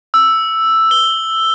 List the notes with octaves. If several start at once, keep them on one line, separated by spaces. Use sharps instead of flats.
E6
G7